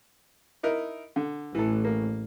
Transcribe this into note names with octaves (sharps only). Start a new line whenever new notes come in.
D#4 E4 A#4
D3
A1 E3 A4
A#3